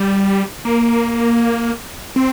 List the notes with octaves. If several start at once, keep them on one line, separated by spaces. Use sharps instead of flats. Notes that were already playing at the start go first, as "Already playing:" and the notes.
Already playing: G3
A#3
C4